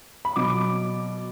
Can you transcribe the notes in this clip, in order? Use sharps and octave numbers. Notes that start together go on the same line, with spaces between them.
B5
B2 F#3 D6